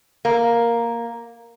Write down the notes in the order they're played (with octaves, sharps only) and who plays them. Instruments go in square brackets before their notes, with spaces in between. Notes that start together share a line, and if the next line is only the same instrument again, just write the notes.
[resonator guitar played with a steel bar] A#3